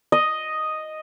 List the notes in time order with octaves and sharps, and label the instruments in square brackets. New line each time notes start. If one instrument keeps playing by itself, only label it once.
[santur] D#5